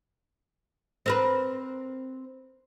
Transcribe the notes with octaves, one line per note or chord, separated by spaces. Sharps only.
C4 A#4 B4